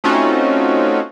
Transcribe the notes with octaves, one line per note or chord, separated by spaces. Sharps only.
A3 C4 C#4 D#4 F4 F#4